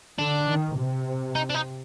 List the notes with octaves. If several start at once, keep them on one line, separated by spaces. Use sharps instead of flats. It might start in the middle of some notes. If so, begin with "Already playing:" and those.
D3 D4
D#3
C3
D#4
D4
D#4